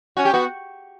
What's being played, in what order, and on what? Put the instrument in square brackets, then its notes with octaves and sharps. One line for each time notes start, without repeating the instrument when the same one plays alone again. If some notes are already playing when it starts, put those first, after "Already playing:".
[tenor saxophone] C#4 [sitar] F#4
[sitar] G4
[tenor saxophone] B3 [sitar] F#4